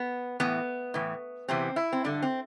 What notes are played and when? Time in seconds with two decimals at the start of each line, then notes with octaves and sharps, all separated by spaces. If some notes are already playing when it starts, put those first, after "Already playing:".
Already playing: B3
0.40 A2 E3 B3
0.94 A2 E3
1.48 E2 C3 E3 C4
1.76 E4
1.92 C4
2.04 G2 D3 D4
2.22 C4